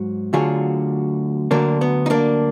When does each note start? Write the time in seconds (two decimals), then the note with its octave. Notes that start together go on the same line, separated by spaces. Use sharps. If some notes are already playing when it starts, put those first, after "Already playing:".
Already playing: G#2 F#3
0.33 D2 D3 F#3 F4 G#4
1.51 D2 D3 F#3 A#3 D4
1.81 B3
2.06 D#4
2.10 A#3 D4